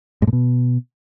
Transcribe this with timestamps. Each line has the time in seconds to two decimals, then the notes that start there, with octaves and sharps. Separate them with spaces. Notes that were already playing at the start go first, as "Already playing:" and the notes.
0.22 G#2
0.27 A2
0.33 B2